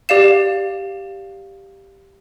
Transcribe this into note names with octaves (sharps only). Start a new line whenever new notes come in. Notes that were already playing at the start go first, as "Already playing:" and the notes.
G4 D5 F5 E7